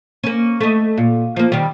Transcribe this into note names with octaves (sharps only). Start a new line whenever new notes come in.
A#3 C#4
A3 D#5
A#2
F3 A#3
D#3 G3